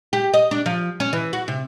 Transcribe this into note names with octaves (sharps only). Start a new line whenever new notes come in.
G4
D#5
D4
F3
C#4
E3
F#4
C3